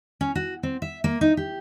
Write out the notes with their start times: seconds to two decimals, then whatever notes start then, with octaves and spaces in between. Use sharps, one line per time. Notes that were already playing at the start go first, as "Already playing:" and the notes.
0.21 C#4
0.35 F#4
0.63 C4
0.82 E5
1.04 A#3
1.21 D#4
1.37 G4